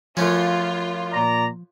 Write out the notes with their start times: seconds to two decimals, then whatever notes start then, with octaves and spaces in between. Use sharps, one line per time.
0.17 F#2 F3 A3 C#4 F4
1.13 A#2 D5 A#5